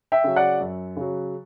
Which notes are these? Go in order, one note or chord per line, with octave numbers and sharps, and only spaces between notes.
E5 G5
C#3 F#3
D5 F#5
F#2
C#3 F#3